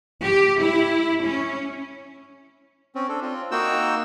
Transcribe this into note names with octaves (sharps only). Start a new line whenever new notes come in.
G4
E4
C#4
C4 C#4
D4 A4
C4 F4
A#3 D#4 F#4 G5 E6